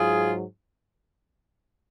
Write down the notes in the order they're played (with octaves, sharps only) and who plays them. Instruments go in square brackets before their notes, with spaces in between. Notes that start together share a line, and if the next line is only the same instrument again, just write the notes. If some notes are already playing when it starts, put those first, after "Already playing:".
Already playing: [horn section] G#2 F#3 F4 G#4